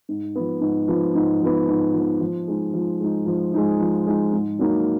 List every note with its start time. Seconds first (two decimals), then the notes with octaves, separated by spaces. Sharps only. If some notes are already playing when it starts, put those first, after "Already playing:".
0.09 G#2
0.35 F3 B3
0.61 G#2
0.88 F3 B3
1.15 G#2
1.41 F3 B3
1.68 G#2
1.94 F3 B3
2.21 F3
2.48 G#3 D#4
2.74 F3
3.00 G#3 D#4
3.26 F3
3.54 G#3 D#4
3.80 F3
4.06 G#3 D#4
4.33 G#2
4.59 F#3 A#3 D#4